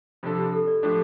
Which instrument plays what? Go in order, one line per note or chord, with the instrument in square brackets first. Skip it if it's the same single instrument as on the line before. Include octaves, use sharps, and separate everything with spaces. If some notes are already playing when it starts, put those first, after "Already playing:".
[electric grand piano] C3 F3 D4 A4 [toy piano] F4
[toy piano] G4
A4
D5
[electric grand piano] A2 F3 D4 G4 [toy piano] A4